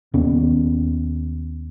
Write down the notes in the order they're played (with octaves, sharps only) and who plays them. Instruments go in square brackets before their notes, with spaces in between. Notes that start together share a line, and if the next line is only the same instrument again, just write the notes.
[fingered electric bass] D#2 B3 C#4